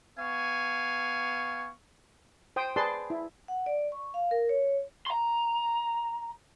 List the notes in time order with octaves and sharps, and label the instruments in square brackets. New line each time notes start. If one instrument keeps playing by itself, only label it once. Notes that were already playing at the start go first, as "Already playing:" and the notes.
[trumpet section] B3 F5 C#6 [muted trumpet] G#5
[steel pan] C5 G5 D#6
G#4 B4 D5 A5 C6
E4
[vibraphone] F#5
D5
C#6
F5
A#4
C#5
[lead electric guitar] A#5 C6